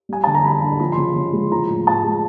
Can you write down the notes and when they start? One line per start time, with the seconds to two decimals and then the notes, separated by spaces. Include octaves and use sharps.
0.09 G3 G#5
0.24 D3 A5
0.35 A#5
0.45 G3 B5
0.62 D3
0.80 F3 B5
0.92 C6
0.98 C#3
1.16 C#3
1.33 G#3
1.52 F3 A#5
1.70 A2
1.87 A2 A5
2.04 G#3